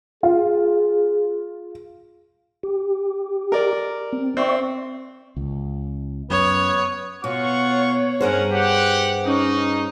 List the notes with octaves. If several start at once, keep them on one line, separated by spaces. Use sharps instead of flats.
F4 G#4
G4
A#4 D5
C4
C4 D5 E5 C#6
C#2
F#2 B3 C#5
B2 F4 C#5 F#5 C#6
G2 C#4 G#4 A#4 C5 F#5
G4 F#5
C#4 D#4